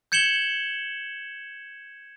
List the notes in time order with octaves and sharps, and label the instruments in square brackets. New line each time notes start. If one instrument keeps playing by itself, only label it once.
[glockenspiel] G6 G#6 C#7 E7 F#7 G7